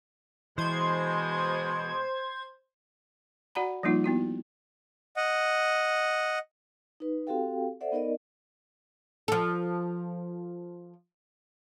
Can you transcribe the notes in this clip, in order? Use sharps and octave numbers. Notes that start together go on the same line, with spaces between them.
B2 E3 G#3 C5 G#6
F#4 D5 F#5 A#5 B5
F3 G3 A#3 D#4 F4
B3 E4 F#4
D#5 F#5
D#4 B4
C4 F#4 G4 A4 F5 G5
A4 C5 D5 E5 F#5
B3 D#4 A#4 D5 D#5
F3 A4